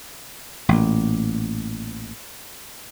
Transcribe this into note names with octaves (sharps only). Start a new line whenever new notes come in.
A1 A#2